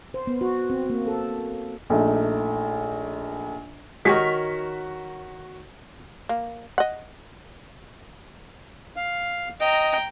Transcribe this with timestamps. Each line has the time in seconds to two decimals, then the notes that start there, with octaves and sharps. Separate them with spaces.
0.14 C5
0.27 B3
0.41 F#4
0.70 C4
0.90 A#3
1.07 A4
1.90 A#1 A3 D#4
4.05 D#3 G#3 F#4 G4 A#4 C#5 B6
6.29 A#3
6.78 D#5 F#5
8.97 F5
9.61 D#5 G5 A#5